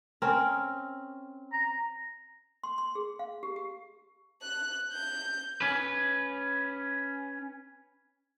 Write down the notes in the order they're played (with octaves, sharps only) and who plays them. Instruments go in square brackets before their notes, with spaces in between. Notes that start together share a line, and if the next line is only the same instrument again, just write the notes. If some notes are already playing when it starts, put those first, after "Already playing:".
[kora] C4 C#4 A#4
[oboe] A#5
[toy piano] C6
C6
G#4
F5
G4
G4
[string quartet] F#6
G6
[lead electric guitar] C#4 B4